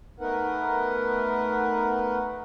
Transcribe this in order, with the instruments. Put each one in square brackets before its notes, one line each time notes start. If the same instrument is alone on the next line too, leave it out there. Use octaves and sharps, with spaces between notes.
[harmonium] A3 B3 D#4 A#4 B4 F#5